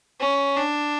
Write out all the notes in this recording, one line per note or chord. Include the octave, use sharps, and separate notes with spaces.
C#4
D4